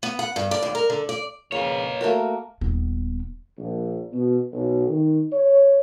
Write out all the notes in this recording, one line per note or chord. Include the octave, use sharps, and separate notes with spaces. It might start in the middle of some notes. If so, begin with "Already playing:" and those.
B3
F#5
G2
D5
D#2
A#4
D3
D5
F2 C#3 A#3 B4 C#5
A3 A#3 F#4 A#4
D#1 B3
A#1
B2
B1
D#3
C#5